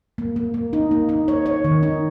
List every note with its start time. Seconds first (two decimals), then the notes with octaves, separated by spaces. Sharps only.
0.18 A#3
0.36 A#3
0.54 A#3
0.73 D#4
0.91 A#3
1.09 D#4
1.28 C#5
1.46 C#5
1.64 D#3
1.83 D#4